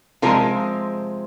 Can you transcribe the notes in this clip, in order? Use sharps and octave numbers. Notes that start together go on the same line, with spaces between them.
C3 F3 G#3 F4 A#4